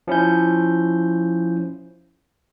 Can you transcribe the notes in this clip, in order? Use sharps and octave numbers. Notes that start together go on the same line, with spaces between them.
F3 C#4 E4 G6